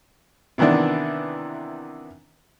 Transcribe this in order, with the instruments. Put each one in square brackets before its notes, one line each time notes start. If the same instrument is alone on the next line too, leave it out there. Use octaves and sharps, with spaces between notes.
[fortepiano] C3 D#3 E3 B3 D4